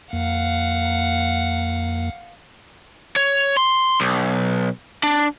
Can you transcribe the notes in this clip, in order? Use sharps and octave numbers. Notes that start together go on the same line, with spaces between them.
F2 A#3 F5 F#5
C#5
C6
B1
D4